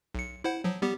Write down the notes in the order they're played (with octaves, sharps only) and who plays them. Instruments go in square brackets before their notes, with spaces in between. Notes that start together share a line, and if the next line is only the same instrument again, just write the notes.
[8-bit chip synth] B1 C#7
E4 C5 F#5
F3 F#3
G3 B3 G4